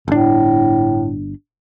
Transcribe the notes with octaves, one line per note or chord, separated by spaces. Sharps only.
G1 A2 D4